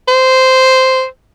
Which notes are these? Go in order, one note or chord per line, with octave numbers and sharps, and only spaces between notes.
C5